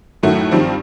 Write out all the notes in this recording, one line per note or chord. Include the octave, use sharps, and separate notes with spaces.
F#2 A2 D#3 A3 F#4
G2 D#3 F3 G3 C4